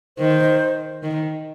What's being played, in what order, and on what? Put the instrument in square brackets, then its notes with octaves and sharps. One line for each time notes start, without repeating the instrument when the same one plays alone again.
[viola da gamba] D#3 [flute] C5
[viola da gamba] D#3